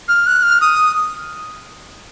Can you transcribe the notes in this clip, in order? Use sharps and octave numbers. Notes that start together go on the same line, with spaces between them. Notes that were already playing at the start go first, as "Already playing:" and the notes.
F6
F#6
F6
D#6